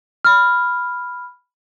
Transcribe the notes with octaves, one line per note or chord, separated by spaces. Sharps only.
B5 F6